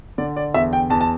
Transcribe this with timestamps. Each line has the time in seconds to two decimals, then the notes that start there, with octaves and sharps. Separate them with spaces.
0.18 D3 D5
0.36 D5
0.54 E2 E5
0.73 G5
0.90 E2 A5
1.01 A5